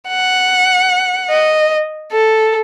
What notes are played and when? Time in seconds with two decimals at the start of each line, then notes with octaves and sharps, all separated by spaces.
0.09 F#5
1.30 D#5
2.12 A4